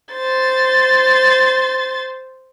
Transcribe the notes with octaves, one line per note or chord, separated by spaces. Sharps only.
C5 A6